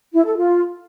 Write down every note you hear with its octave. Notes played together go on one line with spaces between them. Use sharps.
E4
A4
F4